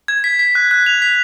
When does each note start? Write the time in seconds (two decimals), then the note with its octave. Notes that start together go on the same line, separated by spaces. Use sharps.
0.08 G#6
0.24 B6
0.39 B6
0.55 F#6
0.71 F#6
0.86 F7
1.02 B6